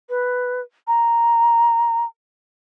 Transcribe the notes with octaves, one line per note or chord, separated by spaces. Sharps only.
B4
A#5